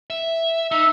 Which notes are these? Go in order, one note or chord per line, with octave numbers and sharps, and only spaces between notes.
E5
D#4 E5